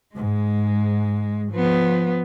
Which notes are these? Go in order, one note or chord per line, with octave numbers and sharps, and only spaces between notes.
G#2 G#3
F3 B3